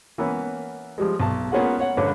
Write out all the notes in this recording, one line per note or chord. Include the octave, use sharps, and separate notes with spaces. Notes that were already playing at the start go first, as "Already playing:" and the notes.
E3 A#3 B3 C#4
F3 G3 G#3
B1 A5
A#3 B3 C#4 F4 G#4 F#5
C#5 F#5
A#1 D3 C#4 B4 C#5 D6